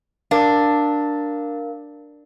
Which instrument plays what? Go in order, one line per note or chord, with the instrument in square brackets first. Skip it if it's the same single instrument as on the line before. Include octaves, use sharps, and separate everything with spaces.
[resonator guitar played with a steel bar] D4 [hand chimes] A#4 F5